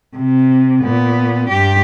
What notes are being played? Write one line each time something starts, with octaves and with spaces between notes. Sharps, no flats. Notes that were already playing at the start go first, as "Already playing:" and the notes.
C3
A#2 B3
G2 G4